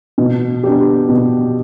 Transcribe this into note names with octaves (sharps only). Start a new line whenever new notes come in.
B2
B3 D4 G4
B2